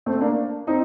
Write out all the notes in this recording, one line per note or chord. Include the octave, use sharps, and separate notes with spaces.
A3 C4
A#3 D4
C4 D#4